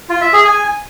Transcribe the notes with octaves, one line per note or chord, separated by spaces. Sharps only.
F4
E5
G#4
G#5